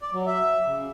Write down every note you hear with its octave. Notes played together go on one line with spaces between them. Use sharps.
D5
F#3
E5
C#3